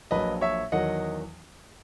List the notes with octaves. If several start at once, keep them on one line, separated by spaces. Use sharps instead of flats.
A#1 A#2 F#3 B4 D#5
C#5 E5
E2 D#3 F#3 D#5 F#5